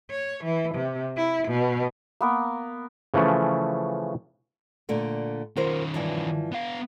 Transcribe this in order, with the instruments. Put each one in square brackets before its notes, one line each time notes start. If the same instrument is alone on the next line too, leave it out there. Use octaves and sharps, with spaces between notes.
[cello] C#5
E3
C3
E4
B2
[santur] A#3 B3 A#4
[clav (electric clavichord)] C#3 E3 F3 A3 C#4
[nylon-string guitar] A#2 D3 A3
[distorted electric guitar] D#3 C#4 [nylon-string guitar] F4 A#4 C5
[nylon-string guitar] G2 E3 F3
[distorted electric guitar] B3 F5